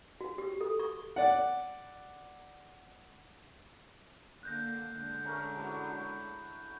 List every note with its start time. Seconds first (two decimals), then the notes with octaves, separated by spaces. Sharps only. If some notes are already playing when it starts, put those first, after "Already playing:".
0.21 F#4
0.38 G4
0.61 A4
0.79 C#6
1.16 D5 F#5
4.43 D3 A#3 F#6 G6 A#6
4.94 D3 G#3
5.25 A3 C#4 A#4
5.57 F#3 E4 C#5
5.90 F#4 B5